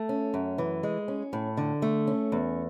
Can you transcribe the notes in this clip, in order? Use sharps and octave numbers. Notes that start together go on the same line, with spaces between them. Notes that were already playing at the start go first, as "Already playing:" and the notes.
Already playing: A3
C#4
F#2
E3
G#3
C#4
A2
D3
A3
C#4
E2